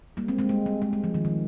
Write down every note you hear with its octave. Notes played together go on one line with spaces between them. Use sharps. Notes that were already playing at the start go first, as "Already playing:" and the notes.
G3 A#3
G#3 C4
G#3 C4
G#3
G3
G#3
G#3
F3
D#3
D#3